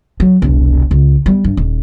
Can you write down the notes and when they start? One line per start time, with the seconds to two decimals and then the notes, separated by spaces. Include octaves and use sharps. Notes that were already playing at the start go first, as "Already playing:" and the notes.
0.20 F#3
0.42 E1 C2
0.91 C#2
1.26 G3 B3
1.44 G2
1.57 D#1